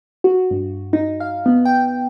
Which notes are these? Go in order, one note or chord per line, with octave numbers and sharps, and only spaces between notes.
F#4
G2
D#4
F5
B3
G5